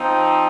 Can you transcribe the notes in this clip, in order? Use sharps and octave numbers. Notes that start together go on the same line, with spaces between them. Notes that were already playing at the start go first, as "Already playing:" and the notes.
Already playing: F3 C4 D#4